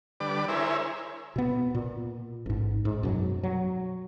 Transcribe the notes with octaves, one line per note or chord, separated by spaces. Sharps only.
D3 G3 B4 D5 D6
E4 G#4 A#4 C5 C#5 E5
B2 B3
A#2
A1 G#2
G#2
F#2 B2 F#3
F#3